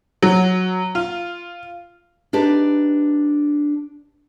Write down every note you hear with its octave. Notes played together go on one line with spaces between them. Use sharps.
F#3
F4
D4 D#4 G4 B4